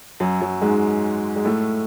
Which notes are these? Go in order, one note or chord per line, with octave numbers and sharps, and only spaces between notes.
F#2 F#3
F#2 F#3
G#2 G#3
G#3
A2 A3